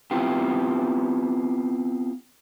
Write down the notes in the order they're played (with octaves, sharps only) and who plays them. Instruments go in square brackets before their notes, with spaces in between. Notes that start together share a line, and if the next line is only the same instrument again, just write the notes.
[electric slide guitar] B3 C4 E4 F4 G4